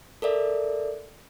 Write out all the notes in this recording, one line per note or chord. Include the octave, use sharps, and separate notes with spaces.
A4 A#4 D5 E5